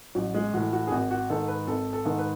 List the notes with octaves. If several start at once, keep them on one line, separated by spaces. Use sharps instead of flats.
A1 F#3
G#3
A2 E3 F#4
F#4
G#4
G#1 F#4
F#4
G#2 D#3 A4
B4
G#1 A4
A4
G#2 D#3
B4